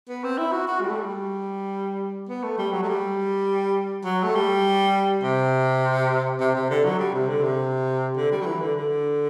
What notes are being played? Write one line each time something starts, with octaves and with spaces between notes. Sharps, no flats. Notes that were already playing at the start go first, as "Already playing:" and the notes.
B3
C4
E4
F#4
F#4
G3
A3
G3
B3
A3
G3
F#3
A3
G3
F#3
A3
G3
C3
C3
C3
D3
F#3
G3
C3
D3
C3
D3
G3
F#3
E3
D3
D3